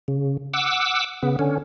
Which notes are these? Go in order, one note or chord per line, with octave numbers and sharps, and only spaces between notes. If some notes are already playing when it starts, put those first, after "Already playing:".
C#3
F#5 D6 E6
C#3 B3
D3 C#4